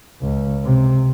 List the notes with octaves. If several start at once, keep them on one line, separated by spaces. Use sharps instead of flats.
C#2
C3